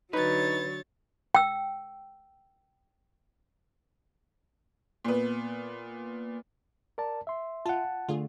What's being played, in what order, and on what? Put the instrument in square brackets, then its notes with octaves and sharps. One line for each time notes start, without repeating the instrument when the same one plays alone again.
[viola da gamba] D3 F#3 [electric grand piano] D#4 [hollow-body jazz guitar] B4 [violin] C#5 A6
[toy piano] G5 E6
[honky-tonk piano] A#2 B3
[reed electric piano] A#4 D5 A5
E5 C6
[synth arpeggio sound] F4 [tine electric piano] F#5 A5
[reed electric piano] D3 A3 [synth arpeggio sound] F4 G#4